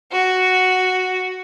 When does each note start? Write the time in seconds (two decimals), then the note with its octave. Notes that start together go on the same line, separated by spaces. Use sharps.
0.12 F#4